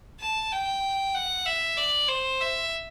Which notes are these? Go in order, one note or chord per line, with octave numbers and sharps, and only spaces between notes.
A5
G5
F#5
E5
D5
C5
E5